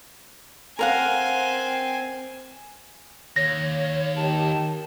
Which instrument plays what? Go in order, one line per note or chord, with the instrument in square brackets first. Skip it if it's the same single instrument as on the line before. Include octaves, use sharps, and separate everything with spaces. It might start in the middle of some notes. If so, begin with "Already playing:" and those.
[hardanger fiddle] C4 G#5 [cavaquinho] A#4 F5 F#5
[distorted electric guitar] D#2 [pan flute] C#5 [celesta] A#6
[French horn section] D#3 G4 [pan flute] A5